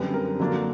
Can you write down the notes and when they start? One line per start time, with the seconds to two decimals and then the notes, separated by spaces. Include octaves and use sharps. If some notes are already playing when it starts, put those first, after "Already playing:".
Already playing: F#2 D3 G3 C4 B4
0.14 A#4
0.40 D3 F#3 A#3 D4